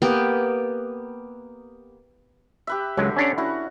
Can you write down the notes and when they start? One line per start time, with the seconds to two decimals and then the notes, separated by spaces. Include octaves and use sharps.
0.02 A#3 B3 G4
2.67 G4 B4 E5
2.97 C#2 D3 F#3 G#3
3.17 C#4 D4 C#5
3.38 C#4 E4 F#4